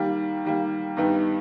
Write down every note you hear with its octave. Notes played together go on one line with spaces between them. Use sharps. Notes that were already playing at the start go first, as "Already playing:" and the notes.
Already playing: D#3 G3 A#3
D#3 G3 A#3
G2 D#3 G3 B3 D#4